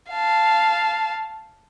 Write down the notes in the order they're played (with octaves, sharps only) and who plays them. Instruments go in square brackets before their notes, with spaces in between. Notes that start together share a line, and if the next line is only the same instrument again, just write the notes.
[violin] F5 A5